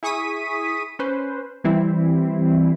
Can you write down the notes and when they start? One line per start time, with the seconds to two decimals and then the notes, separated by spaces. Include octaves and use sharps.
0.03 E4 G#4 C#6 D#6 B6 D#7
0.99 C#4 B4 C5
1.64 E3 G3 C4 E4